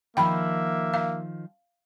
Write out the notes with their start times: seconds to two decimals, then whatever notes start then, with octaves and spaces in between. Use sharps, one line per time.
0.17 D#3 F3 A#3 E5 G5 B5
0.94 F5